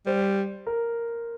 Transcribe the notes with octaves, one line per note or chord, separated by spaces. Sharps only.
G3 C5
A#4